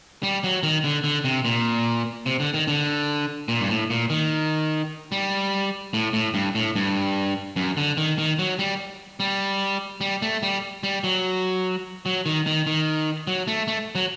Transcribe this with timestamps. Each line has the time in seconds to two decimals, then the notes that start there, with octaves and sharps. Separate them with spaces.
0.23 G3
0.44 F#3
0.63 D#3
0.84 D3
1.04 D3
1.25 C3
1.45 A#2
2.26 C3
2.40 D3
2.54 D#3
2.68 D3
3.48 A#2
3.60 G2
3.69 A2
3.90 A#2
4.10 D#3
5.12 G3
5.94 A2
6.13 A2
6.34 G2
6.55 A2
6.76 G2
7.56 F#2
7.77 D3
7.97 D#3
8.18 D#3
8.39 F#3
8.59 G3
9.20 G3
10.01 G3
10.22 A3
10.43 G3
10.83 G3
11.04 F#3
12.06 F#3
12.26 D#3
12.46 D#3
12.67 D#3
13.27 F#3
13.47 A3
13.68 A3
13.95 F#3